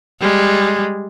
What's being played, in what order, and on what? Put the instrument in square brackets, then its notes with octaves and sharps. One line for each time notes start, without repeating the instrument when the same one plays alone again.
[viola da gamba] G3 [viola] G#3